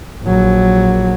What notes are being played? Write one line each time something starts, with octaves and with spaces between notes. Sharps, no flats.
A#1 F#3